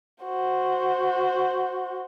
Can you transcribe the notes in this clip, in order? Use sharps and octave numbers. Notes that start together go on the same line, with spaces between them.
F#4 C5